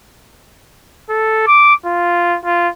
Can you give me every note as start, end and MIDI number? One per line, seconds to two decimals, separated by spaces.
1.10 1.45 69
1.47 1.74 86
1.86 2.38 65
2.45 2.69 65